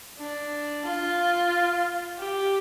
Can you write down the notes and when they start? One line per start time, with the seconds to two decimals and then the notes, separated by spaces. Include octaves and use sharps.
0.19 D4
0.86 F4
2.19 G4